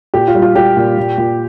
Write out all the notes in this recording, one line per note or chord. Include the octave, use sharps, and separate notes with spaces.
A#2 G4
F4
G3
F4
G3 G4
A#2
A#2
A#2